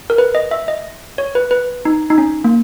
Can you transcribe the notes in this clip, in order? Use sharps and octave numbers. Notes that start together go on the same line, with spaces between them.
A#4
B4
D#5
E5
D#5
C#5
B4
B4
D#4
D#4
C#4
A#3